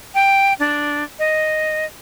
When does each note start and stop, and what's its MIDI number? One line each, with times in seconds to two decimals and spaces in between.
0.14 0.53 79
0.59 1.04 62
1.19 1.86 75